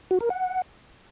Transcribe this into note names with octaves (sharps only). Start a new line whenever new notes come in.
F#4
A#4
F#5